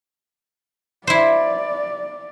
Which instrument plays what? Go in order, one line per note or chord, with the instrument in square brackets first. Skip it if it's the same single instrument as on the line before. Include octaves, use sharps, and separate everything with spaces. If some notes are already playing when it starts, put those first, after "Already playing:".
[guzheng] E4 C5 [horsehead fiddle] D5